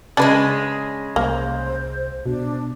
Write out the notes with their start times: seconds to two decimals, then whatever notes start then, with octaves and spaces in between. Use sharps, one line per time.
0.17 C#3 G#3 D4 B4
1.16 C2 A#3 C5
2.26 B2 D4